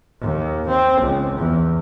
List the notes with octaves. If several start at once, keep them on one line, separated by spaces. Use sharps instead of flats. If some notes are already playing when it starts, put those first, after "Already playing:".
D#2
C4
C#2
E2